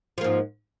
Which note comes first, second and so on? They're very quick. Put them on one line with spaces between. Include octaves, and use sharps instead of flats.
F3 A#3 G#2